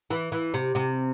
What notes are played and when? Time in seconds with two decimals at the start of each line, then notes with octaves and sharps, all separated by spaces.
0.10 E3
0.32 E3
0.54 C3
0.75 C3